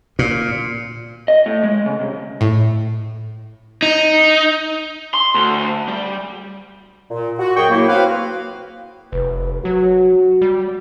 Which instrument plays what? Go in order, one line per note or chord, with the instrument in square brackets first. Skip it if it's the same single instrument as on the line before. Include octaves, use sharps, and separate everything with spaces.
[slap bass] A#2
[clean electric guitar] D#5
A2
G#3
C#3
C2
[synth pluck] A2
[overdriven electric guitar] D#4
[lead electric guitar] C6
D2
G3
[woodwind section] A#2
F#4
F#2 G#4 G5 C#6
F#3 A#3 E4
C4 F#4 B4 F5
[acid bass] F1 [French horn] B4
[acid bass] F#3 [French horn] F#4
[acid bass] G3